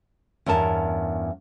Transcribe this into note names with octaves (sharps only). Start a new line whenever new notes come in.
E2 G2 C#4 A#4 A5